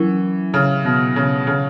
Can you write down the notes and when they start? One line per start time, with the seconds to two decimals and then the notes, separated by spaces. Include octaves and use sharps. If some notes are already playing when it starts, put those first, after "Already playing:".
Already playing: E3 F#3 C#4 E4 A#4
0.54 C#3
0.85 B2
1.16 C#3
1.47 C#3